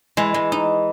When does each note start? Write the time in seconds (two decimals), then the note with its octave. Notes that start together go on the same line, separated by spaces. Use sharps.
0.17 E3 G#3
0.34 G#3
0.52 D#4